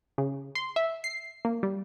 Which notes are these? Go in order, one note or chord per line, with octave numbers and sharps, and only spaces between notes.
C#3
C6
E5
C7
A#3
G3